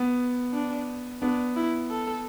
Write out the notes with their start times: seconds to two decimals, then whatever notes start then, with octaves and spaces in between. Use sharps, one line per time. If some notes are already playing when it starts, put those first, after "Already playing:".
Already playing: B3
0.53 D4
1.21 B3 D4
1.56 E4
1.90 A4